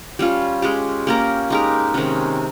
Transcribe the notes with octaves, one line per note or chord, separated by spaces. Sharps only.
G3 C#4 F4
G#3 C#4 G4
A#3 C#4 G4 A#4
G#3 D#4 G4 A#4
C3 D#3 G#3 C#4